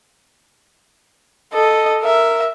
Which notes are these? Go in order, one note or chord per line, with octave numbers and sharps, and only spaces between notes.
A4 D#5
A#4 E5